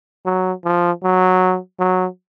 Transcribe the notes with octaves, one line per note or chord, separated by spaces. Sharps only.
F#3
F3
F#3
F#3